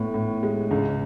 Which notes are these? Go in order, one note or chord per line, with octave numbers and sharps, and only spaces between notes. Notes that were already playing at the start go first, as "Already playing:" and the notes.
Already playing: A2 B3
A2
G#3
C#2